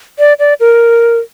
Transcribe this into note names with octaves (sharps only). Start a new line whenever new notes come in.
D5
D5
A#4